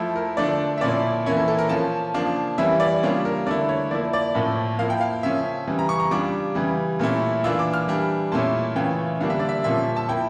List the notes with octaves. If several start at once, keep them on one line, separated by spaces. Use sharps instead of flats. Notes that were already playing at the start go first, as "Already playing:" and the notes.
Already playing: F3 A3 E4
A#4
D3 F3 A3 D4 D5
E5
A#2 F3 C#4 E4 D5
E3 A#3 C#4 E4 C#5
A4
A4
A#4
F3 C#4 F4 A5
C#3 F3 A#3 D4 F5
E3 G3 C#4 E4 E5
D5
C#3 G3 A#3 D4 F4 C#5
A#4
D3 A3 E4 D5
C#5
F3 A#3 E4 D5
D5
A2 F3 A#3 C#4 E5
F3 A#3 E4 F5
G5
F5
C#3 F3 C#4 E5
C#3 E3 G3
A#5
C#6
A#5
C#3 G3 D4 F4 D6
C#3 E3 G3
A#2 A3 C#4 E4
E3 A#3 D4 F4 E6
D6
F6
E3 G3 D4
A#2 A3 C#4 E4 A5
C#3 E3 A3 C#4 F4 G5
D3 G3 A#3 D4 F5
E5
D5
E5
A#2 F3 C#4 E5
A5
F3 A#3 E4 G5